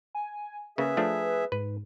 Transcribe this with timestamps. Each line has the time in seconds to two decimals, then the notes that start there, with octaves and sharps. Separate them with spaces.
0.15 G#5
0.78 C#3 A#3 G#4 B4 E5
0.97 F3 A3 D4
1.52 G#2 B4